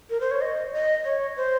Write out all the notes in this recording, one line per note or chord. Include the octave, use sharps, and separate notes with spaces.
A#4
C5
C#5
D#5
D#5
C#5
C5